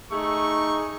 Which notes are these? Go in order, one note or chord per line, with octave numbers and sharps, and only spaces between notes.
A3 D#4 G#4 C#6